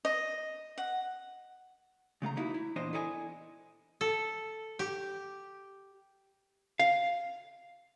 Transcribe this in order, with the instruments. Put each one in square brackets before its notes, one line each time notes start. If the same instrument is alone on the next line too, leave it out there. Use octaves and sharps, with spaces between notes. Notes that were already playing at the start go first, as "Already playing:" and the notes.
[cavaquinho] D#5
F#5
[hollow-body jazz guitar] C#3 A3 F5 A#5
D3 A#3 D#4 E4 F#4
E4
E2 A#2 D4 C5 D#5
E4 A4 D5 D#5 F#5 G#5
[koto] A4
G4
[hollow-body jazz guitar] F5